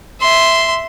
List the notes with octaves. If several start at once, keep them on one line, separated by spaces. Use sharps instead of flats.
E5 C6